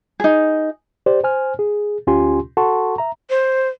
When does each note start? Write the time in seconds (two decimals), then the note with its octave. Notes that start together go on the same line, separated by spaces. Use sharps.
0.20 D#4 G#4
1.06 G4 C5 D5
1.24 C5 G#5 F6
1.59 G#4
2.07 D2 C#4 F4 G4 G#5 C6
2.57 F#4 A4 F#5 A5 C6 C#6
2.98 E5 A#5
3.30 C5